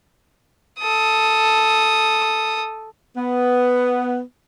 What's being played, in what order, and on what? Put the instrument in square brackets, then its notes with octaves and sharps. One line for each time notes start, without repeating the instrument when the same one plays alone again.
[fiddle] A4 D#6
[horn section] B3